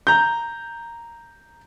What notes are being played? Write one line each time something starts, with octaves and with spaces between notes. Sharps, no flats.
A#5 G6